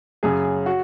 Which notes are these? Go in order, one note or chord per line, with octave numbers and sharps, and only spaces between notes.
F#2 C#3 G#4
F#4